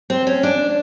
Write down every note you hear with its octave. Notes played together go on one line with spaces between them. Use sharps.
C4
C#4
D4